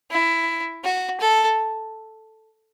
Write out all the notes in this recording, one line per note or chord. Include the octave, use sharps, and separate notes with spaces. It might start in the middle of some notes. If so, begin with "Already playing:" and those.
E4
F#4
A4